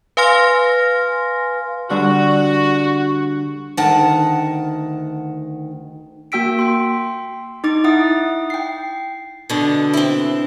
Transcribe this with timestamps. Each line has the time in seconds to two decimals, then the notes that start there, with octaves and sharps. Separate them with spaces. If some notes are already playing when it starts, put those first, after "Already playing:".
0.17 B4 F5 G#5 C6 F6 A#6
1.90 D3 G3 F#4
3.77 D2 D#3 F#5 A5
6.32 A#3 F#4 G5 E6 B6 D7
6.59 G5 C6
7.64 D#4 D6 A6
7.84 E4 E5 F#5 D#6
8.50 G5 C7
9.49 B2 D3
9.93 C4 E4